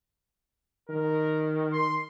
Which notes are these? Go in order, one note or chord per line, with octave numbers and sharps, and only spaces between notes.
D#3 A#4
C6